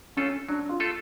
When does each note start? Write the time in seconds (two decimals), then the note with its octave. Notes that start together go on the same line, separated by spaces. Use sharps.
0.17 A3 C#4 F4 A4
0.49 F#3 D4
0.69 F4
0.80 A3 F4 A4